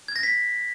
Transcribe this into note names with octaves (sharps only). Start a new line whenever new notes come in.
G#6
A#6
B6